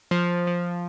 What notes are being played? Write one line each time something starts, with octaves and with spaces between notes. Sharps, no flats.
F3
F3